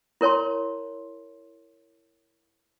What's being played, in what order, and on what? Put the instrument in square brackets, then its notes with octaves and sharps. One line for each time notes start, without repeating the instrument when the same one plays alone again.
[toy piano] E4 A#4 C#5 A5 C6